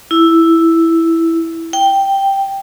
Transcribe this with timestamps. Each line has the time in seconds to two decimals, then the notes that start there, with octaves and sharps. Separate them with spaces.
0.11 E4
1.73 G5